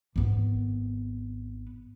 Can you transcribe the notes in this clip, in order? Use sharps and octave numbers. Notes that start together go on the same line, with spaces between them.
G#1 B3